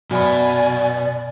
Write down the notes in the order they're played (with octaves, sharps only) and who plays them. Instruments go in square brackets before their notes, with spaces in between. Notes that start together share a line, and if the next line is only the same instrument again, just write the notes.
[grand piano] F#2 B5 [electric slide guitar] B2 [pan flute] D5 [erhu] G#5